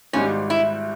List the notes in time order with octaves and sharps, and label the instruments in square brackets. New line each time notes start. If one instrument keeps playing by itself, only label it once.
[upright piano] G#1 G#2 G3 [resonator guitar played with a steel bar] C#4
[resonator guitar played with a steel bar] E4